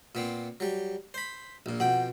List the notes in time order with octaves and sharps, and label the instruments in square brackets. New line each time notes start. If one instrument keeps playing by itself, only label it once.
[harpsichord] A#2 B3 C4
F#3 G3
C5 B5
A#1 A#2
[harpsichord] F2 B2 G5 [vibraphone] F#5